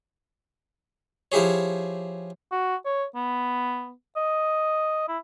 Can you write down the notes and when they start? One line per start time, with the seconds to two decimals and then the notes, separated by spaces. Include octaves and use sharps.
1.32 F3 E4 G4 G#4 C#5
2.51 F#4
2.85 C#5
3.16 B3
4.16 D#5
5.08 E4